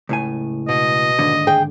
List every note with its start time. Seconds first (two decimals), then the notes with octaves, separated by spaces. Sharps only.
0.09 C#2 A2 G#5
0.69 B2 D#5
1.19 D#2 G#2 D3
1.47 G#4 G5